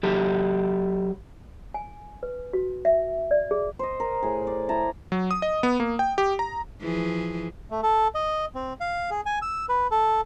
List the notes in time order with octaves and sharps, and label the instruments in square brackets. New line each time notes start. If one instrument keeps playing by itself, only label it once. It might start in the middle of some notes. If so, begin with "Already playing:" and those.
[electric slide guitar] F#3 G4 A4
[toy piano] G#5
B4
F#4
E5
D5
G#4
[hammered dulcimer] C5 D#5
A#4
A2 G#4
D5
E4 A5 A#5
[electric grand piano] F#3
D#6
D#5
B3
A#3
G5
G4
A#5
[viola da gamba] E3 F3 G#4
[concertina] A3
A4
D#5
C4
F5
G#4
G#5
E6
B4
A4